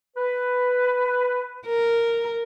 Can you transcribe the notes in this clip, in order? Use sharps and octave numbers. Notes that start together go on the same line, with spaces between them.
B4
A#4